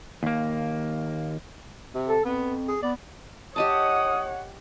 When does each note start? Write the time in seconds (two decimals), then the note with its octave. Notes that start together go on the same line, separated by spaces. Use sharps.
0.23 D#2 A#3
1.94 C3
2.09 A4
2.25 F2 B3
2.68 G#4
2.82 B3 D5
3.56 G4 C#5 D#5 F#5 A5 D#6